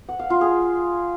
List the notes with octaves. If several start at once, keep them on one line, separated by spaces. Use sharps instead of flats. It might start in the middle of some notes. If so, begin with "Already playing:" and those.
F#5
F5
F4
G#4